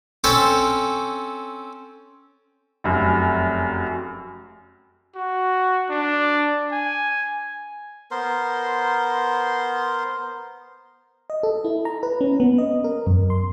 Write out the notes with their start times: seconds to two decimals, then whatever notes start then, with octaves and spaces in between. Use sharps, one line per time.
0.24 C4 C#4 A4 C5
2.84 F1 F#2
5.15 F#4
5.90 D4
6.72 G#5
8.11 B3 A#4 C5 C6
11.30 D#5
11.43 A4
11.65 E4
11.85 A#5
12.03 B4
12.21 C#4
12.40 B3
12.58 D#5
12.84 A#4
13.07 F#2
13.30 C6